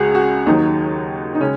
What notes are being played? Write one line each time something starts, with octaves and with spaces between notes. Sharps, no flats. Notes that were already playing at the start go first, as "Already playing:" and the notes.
Already playing: C#2 C#3 G#3 F#4 G#4
F#4
D#2 D#3 F#3 D#4
D#4
C#3 G#3 C#4